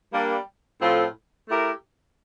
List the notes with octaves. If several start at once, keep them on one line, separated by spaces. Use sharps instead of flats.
G3 A#3 D4
A2 F3 C4 F4 A4
A3 E4 G4 A#4